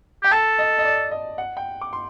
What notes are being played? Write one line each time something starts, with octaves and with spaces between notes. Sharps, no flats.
G4 G5
A4 A5
D#5
D#5
D5
D#5
F#5
G5
D6
C6